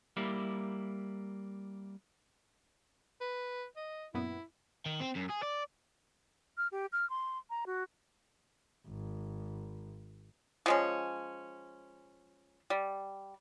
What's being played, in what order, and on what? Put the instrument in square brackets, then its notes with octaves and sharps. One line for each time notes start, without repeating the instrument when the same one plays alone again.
[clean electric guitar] G3 A#3 E4
[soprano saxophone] B4
D#5
[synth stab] F#2 A#2 B3 [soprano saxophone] E4
[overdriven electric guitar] D#3
C4
F#2
G#4
D5
[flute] F6
G4
F6
C6
A#5
F#4
[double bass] G#1
[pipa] F3 G#3 C#4
G3